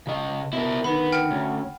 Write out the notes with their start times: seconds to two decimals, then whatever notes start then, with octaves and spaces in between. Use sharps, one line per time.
0.07 C#3 D#5
0.53 B2 E4 A#4
0.84 D3 D#3 B3 B5
1.12 F#5 G5 F6
1.31 D2 C#4